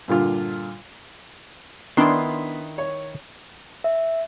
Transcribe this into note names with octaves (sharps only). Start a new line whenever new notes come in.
G2 A#2 D3 F4
D#3 B3 D4 E4 C6
C#5
E5